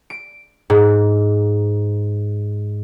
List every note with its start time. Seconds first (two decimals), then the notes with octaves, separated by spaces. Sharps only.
0.10 D7
0.70 G#2